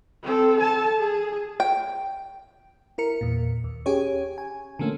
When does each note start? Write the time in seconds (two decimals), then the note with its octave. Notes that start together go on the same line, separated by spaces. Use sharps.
0.23 C4 A4
0.60 A4 A5
0.99 G#4
1.60 G5
2.98 E4 A#4 C#7
3.21 E2 A#2
3.64 D#2
3.86 C#4 G4 G#4 C#5
4.38 G#5
4.79 D3 F3 A3 A#3 C#4